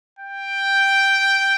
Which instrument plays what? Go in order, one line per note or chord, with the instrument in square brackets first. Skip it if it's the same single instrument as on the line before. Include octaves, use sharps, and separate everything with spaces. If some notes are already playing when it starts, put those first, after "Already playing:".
[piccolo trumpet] G5